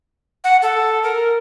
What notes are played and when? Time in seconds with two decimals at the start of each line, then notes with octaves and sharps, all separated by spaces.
0.44 F#5
0.62 A4
1.03 A#4